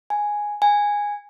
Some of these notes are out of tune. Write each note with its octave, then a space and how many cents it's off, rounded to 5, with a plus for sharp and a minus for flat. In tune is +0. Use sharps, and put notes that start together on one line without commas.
G#5 +0
G#5 -10